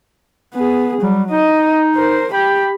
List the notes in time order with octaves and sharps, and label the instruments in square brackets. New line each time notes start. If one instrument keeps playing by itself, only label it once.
[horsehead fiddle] B3 G#4
[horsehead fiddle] F#3 [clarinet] G3
[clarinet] D#4 [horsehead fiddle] D#5
[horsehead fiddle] A#4 C5
[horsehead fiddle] G4 B5 [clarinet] G5